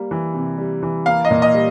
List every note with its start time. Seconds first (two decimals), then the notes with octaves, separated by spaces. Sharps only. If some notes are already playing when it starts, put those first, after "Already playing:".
Already playing: G3 A#3
0.11 E3
0.34 C3
0.58 G3
0.83 E3
1.06 A#3 F5
1.25 D#5
1.31 A#2
1.42 D#5
1.54 G3